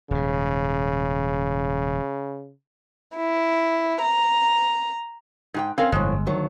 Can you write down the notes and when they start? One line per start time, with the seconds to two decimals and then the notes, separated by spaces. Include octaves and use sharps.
0.11 D#1 G#2 C#3
3.16 E4
4.01 A#5
5.54 G#2 G4 G5
5.78 C4 C#4 A#4 F5
5.92 G1 F2 A2 G#3
6.27 D2 D#3 F#3